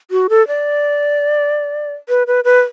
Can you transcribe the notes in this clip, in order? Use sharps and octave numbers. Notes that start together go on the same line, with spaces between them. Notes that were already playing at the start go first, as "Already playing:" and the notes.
F#4
A4
D5
B4
B4
B4